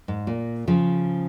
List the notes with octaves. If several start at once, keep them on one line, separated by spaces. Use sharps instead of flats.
G#2
A#2
C#3 F3